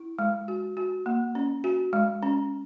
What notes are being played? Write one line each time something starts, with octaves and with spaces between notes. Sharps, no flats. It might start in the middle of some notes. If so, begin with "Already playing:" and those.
Already playing: E4
G#3
F#4
F#4
A#3
C#4
F#4
G#3
C#4